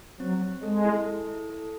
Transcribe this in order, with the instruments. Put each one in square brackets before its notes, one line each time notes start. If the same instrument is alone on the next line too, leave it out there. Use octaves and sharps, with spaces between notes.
[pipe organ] F#3 [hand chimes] C4
[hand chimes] C4
[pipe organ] G#3 [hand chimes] A4
[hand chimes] E4
A4
E4
A4